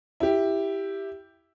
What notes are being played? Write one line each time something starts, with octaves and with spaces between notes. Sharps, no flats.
E4 G4